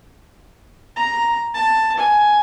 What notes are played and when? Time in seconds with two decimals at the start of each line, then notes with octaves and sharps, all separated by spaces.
0.96 A#5
1.54 A5
1.97 G#5